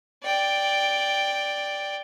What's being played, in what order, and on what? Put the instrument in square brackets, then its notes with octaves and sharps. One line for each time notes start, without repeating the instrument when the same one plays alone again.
[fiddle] D5 G5